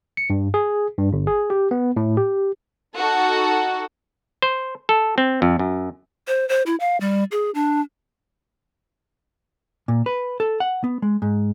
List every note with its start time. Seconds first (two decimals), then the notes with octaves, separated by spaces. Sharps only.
0.17 C#7
0.30 G2
0.54 G#4
0.98 G2
1.13 G1
1.27 G#4
1.50 G4
1.71 B3
1.96 A2
2.17 G4
2.95 D#4 F#4 A4
4.42 C5
4.89 A4
5.18 C4
5.42 F2
5.59 F#2
6.27 C5
6.49 C5
6.66 E4
6.80 F5
7.00 G3
7.31 G#4
7.54 D4
9.88 A#2
10.06 B4
10.40 A4
10.60 F#5
10.84 B3
11.02 G#3
11.22 G#2